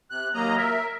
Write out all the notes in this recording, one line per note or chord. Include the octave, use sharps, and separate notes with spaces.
C3 F#6
D#2 F#3 A#3 D#5 A#5
A#4 E5